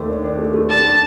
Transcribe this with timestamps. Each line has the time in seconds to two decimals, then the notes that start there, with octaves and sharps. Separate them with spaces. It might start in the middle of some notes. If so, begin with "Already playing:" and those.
Already playing: D#2 A3
0.09 D4
0.24 D4
0.39 A3
0.54 A3
0.70 D4 A5
0.85 D4